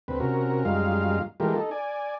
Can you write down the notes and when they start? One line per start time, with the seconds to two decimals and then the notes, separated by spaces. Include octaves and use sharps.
0.08 D2 C4 B4
0.20 C3 C#4 F#4 A#4
0.65 F#2 G3 G#3 D#4 F4 F5
1.40 E3 G#3 A3 F4 G4 A#4
1.55 D#4 A4
1.71 D5 G#5